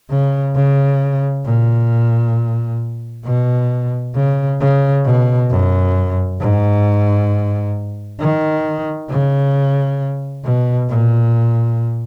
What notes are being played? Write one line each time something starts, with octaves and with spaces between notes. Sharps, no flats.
C#3
C#3
A#2
B2
C#3
C#3
B2
F#2
G#2
D#3
C#3
B2
A#2